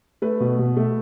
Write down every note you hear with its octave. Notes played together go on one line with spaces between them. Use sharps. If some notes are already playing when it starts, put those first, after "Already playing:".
A3 B4
B2
B2
A3